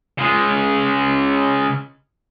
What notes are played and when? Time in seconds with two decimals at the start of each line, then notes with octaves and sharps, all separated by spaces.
0.18 C#3 G#3